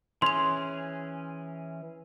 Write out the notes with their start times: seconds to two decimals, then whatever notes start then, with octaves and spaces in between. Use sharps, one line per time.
0.22 E3 C#4 G#4 C6 F7